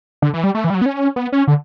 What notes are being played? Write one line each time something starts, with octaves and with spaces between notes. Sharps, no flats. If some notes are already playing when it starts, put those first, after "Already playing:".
D3
E3
G3
A3
E3
G3
F#3
B3
C#4
B3
C#4
D3